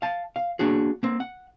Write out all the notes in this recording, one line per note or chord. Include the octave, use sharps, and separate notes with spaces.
F5 A5
F5
A#3 D4 F#4 G#4
A#3 C4
F#5